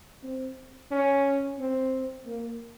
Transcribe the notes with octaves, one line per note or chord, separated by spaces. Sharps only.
C4
C#4
C4
A#3